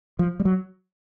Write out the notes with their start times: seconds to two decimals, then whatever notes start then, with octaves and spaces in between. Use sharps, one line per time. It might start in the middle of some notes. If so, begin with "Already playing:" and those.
0.19 F3
0.40 G3
0.45 F#3